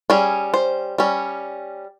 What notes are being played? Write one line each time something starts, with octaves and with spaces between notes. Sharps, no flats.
G3 C#4 G#4
C5
G3 C#4